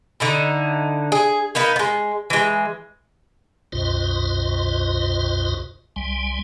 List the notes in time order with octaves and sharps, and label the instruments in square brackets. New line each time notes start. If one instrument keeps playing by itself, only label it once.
[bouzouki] D3 D#4 E4
G#4
A#3 B3 D#4 B4
G#3 B3
E3 G#3
[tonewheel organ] C2 F#2 B2 F4 C5 D#5
C2 G3 G#5